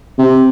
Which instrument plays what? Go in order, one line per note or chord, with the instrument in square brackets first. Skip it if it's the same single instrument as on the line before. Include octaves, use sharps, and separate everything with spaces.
[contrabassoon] C3